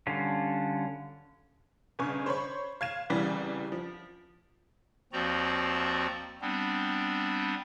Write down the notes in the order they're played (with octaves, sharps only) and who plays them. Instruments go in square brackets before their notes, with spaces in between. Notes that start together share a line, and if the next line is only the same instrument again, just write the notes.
[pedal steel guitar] D3 G3 C#4 F4
[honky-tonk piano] G1 C#3 G#5 C#6
C5 C#5 B5 C#6
F5 G#6 E7
C2 C#3 E3 G3
F3
[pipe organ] D#2 F3 C4 F#4 D5 A#5
G3 B3 C4 D4